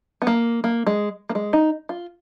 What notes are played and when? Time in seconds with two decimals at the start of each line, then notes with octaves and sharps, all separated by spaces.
0.22 B3
0.27 A#3
0.64 A#3
0.87 G#3
1.29 A#3
1.35 G#3
1.53 D#4
1.89 F4